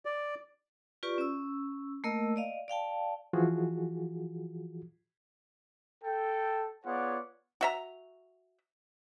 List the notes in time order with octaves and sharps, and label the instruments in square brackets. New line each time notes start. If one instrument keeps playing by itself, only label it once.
[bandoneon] D5
[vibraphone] F4 G4 B4 D5 C#6
C#4 E6
A3 A#3 A#4 D#5 E6
D5 D#5 F5
D5 F5 G5 A5
[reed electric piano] E3 F3 F4 F#4 G#4
[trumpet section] A4 G5
B3 F4 G#4 C#5 D5 F#5
[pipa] F#4 E5 A#5